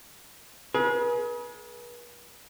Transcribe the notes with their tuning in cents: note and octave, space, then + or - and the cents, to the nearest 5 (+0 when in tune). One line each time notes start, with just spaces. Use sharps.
G#4 +25 B4 -40